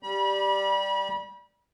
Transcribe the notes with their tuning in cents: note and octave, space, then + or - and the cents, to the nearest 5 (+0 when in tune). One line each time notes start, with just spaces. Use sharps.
G3 +0 B5 -35